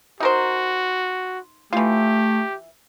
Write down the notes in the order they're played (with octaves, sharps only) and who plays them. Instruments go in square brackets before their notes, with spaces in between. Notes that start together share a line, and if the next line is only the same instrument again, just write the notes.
[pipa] D#4 A#4 C5 [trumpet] F#4
[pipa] E3 F4 [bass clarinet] A3 [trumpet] G4